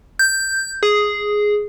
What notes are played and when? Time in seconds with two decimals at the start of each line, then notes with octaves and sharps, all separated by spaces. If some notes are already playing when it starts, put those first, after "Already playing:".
0.19 G6
0.83 G#4